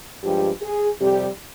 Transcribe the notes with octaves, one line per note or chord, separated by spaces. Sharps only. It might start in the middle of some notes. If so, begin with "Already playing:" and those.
G2 F3 G#3 G4
G#4
F2 C3 G3 G4